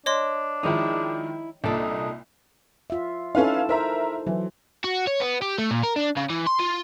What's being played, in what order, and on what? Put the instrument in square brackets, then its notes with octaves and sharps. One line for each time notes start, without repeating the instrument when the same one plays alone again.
[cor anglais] D4 [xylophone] C#5 D#5 C6
[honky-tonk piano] D#3 F3 G#3 [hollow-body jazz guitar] D#4 E4
[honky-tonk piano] C2 A#2 [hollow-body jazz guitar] D4 A4 [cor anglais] D#4
[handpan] F4 E5
[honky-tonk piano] C#4 B4 F5 [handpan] D#4 E4 A4
[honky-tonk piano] A#4 E5 A#5 [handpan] C5
[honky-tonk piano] E3 [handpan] F#3
[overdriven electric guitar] F#4
C#5
B3
G4
A3
A#2
A#4
D4
C#3
E3
C6
F4